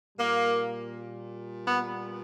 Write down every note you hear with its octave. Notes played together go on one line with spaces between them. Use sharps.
A#2 G3 A#3
B3